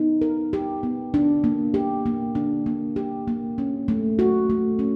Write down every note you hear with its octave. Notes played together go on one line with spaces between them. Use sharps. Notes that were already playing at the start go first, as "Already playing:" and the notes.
Already playing: B3 D#4
A#4
G4
B3
D4
A#3
G4
A#3
D4
A#3
G4
A#3
C#4
A3
F#4
A3
C#4